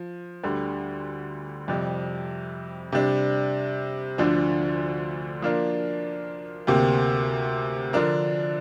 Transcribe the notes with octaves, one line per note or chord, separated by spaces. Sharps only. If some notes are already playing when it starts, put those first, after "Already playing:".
Already playing: F3
D2 D3 G3
F2 C3 G3
C3 G3 D4
D2 D3 F3 D4
F3 A#3 D4 F4 A#4
D2 C3 A#3 G4
D3 F3 D4 A#4